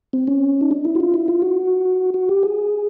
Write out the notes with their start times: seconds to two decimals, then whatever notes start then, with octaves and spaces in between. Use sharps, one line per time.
0.13 C4
0.27 C#4
0.61 D#4
0.71 D4
0.85 E4
0.95 F#4
1.00 F4
1.14 E4
1.28 F4
1.42 F#4
2.14 F#4
2.29 G4
2.43 G#4